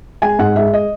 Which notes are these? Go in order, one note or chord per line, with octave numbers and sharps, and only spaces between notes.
G#3 G#5
G#2 F#5
G#3 E5
D#5